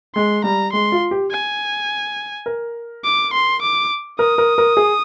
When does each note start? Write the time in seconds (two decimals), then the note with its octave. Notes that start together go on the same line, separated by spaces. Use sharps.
0.15 G#3 C6
0.44 G3 A#5
0.72 G#3 C6
0.92 F4
1.11 G4
1.31 G#5
2.46 A#4
3.04 D6
3.33 C6
3.62 D6
4.19 A#4 D#6
4.38 A#4
4.58 A#4
4.77 G#4